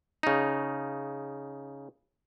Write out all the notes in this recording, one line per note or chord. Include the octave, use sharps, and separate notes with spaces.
C#3 D#4